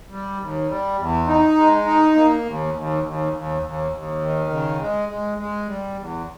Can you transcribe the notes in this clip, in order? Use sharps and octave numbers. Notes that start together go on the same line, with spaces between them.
G3
D#2
G3
E2
D#4
G#3
D#4
A#3
D#2
D#2
D#2
D#2
D#2
D#2
D#3
C#3
G#3
G#3
G#3
G3
E2